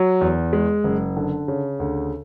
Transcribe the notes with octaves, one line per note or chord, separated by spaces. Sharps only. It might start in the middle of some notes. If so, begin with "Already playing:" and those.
Already playing: F#3
E2
G#3
F#1
D3
C#3
D2